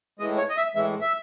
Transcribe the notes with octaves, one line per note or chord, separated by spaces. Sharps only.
A2 E3 G#3 D#5
C#5
D#5
E5
A2 E3 G#3 E5
E5